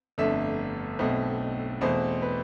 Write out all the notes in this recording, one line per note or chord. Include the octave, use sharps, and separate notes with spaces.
G1 F2 D3 A3 E5
B1 B2 A3 C4
E2 B2 A3 C4 C5
B4